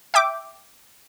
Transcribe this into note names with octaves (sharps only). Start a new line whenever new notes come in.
E5 G5 D6